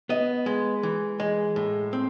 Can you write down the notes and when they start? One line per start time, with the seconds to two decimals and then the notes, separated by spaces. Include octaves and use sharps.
0.09 B3 D#5
0.46 G#3
0.83 E3
1.20 G#3
1.56 A2
1.93 C4